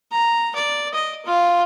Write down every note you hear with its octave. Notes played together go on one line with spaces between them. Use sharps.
A#5
D5
D#5
F4